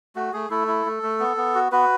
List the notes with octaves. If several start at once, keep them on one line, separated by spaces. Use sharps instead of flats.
A3 F#4
A3 G#4
A3 E4 A4
E4
A3
A3
B3
B3
F#4
B3 F#4 B4